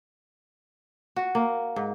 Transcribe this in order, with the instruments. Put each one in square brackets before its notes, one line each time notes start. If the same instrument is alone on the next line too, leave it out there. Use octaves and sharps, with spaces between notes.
[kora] F#4
A#3
G#2